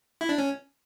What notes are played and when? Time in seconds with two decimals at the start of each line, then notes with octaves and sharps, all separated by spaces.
0.21 E4
0.29 D4
0.38 C#4